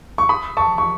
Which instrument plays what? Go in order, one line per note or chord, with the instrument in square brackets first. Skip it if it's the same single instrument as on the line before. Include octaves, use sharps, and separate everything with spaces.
[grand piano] C#6
B5 D#6
A5 C#6
C#6